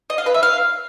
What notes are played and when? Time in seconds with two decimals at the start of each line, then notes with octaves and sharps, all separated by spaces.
0.10 D#5
0.18 F5
0.26 B4
0.34 E5
0.43 F5